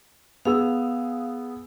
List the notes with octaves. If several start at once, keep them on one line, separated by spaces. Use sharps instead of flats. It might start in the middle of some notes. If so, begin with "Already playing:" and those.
B3 G#4 F5 E6